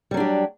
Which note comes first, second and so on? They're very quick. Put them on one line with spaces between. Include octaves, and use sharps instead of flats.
G3 F#3 D4 G4